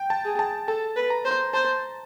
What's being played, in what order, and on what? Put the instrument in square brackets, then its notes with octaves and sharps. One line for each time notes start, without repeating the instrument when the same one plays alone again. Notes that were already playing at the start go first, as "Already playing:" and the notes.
Already playing: [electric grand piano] G5
A5
[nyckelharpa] G#4
[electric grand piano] A5
[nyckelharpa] A4 [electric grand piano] A5
[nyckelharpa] B4
[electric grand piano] A#5
[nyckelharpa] C5
[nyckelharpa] C5 [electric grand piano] A5